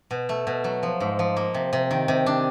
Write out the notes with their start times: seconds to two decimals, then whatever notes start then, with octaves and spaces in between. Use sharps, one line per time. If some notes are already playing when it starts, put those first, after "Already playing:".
0.11 B2
0.29 A3
0.47 B2
0.64 F#3
0.83 F3
1.00 G#2
1.19 F3
1.36 A#3
1.54 C3
1.73 C3
1.91 D#3
2.08 C3
2.26 D4